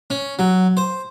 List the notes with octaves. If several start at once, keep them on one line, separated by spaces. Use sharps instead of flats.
C#4
F#3
C5